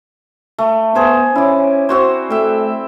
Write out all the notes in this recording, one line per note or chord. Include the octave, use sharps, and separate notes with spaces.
A3
B3 G#4 C5
C#4 E4 D5
C4 F#4 C5
A3 E5 G5